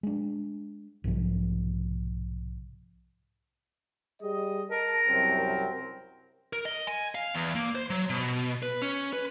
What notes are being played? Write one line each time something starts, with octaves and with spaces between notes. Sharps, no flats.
G#3 D4
B1 G#2 C3 F3
G3 G#4 D#5
A#4 A5
C2 F#2 C4
A#4
D#5
G#5
F5
E2
A#3
C5
F#3
B2
B4
C#4
B4